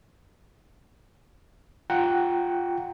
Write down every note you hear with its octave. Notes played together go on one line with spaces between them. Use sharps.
F4 F#5 G5 A#5